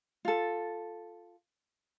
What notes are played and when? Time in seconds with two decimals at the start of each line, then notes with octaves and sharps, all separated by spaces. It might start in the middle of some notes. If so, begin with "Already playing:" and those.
0.25 F4 A4